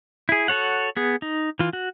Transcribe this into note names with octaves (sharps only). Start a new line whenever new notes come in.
E4 G#4
F#4 A4 C#5 F#5
B3 G#4
D#4
E3 F4
F#4